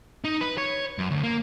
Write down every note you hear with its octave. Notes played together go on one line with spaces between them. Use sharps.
D#4
B4
C#5
F#2
D2
A#3